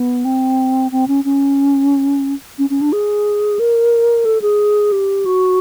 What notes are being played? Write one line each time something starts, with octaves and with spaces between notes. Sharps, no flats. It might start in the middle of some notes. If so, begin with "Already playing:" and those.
Already playing: B3
C4
C4
C#4
C#4
C#4
C#4
D4
G#4
A#4
A4
G#4
G4
F#4